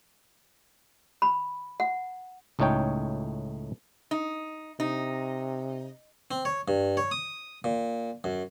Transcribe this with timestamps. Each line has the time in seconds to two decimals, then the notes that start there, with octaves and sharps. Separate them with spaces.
1.22 B5
1.80 F#5
2.59 C#2 A2 A3 D#4 C#5 G5
4.11 D#4
4.80 C3 D#4
6.31 C4
6.45 C#5
6.68 G2
6.97 C#5
7.11 D#6
7.64 A#2
8.24 F#2